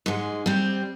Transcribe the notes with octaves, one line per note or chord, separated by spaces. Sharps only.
G#2 G#3
G3 C4